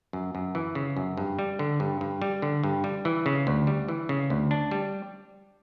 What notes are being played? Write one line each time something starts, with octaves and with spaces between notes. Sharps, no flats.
F#2
F#2
E3
C#3
F#2
G2
G3
D3
G2
G2
G3
D3
G2
G3
E3
C#3
D2
G3
E3
C#3
D2
D4
G3